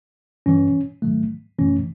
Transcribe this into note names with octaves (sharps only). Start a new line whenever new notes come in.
G2 E3 G3 C#4
G#2 D#3 F#3 A3
F#2 C#3 E3 A3 C#4